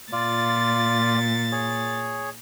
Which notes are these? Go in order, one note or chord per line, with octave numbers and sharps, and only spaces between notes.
A#2 F4 D5 A6
G#4 C#5